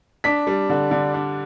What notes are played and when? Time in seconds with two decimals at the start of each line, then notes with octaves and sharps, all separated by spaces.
0.24 D4 B6
0.47 G3
0.69 D3
0.91 D3
1.14 D4